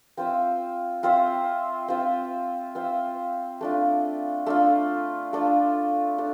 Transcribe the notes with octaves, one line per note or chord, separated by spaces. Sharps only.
C4 F4 C5 E5
C4 F4 C5 E5
C4 F4 C5 E5
C4 F4 C5 E5
A3 D4 F4
A3 D4 F4
A3 D4 F4
A3 D4